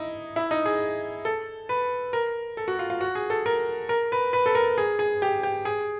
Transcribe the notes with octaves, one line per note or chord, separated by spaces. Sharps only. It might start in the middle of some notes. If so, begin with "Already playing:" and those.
Already playing: D#4 E4
E4
D#4
G#4
A4
B4
A#4
A4
F#4
F4
F4
F#4
G#4
A4
A#4
A#4
B4
B4
A4
A#4
G#4
G#4
G4
G4
G#4